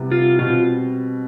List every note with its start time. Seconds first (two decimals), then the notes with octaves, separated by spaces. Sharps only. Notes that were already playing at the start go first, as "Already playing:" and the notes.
Already playing: C3 G3 B3 E4
0.12 F4
0.39 B2 G3 C4 F4